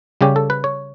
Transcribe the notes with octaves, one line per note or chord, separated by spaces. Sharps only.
C#3 G3 C#4 G4
A4
B4
C#5